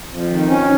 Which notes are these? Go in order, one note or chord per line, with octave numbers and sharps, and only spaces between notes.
F2
D#3
C#4